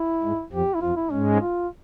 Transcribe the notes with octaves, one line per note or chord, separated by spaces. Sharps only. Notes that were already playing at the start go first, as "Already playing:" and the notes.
Already playing: E4
G#2 G#3
F2 F3 G4
E4
F2 F3 F4
E4
G#2 G#3 C#4
F4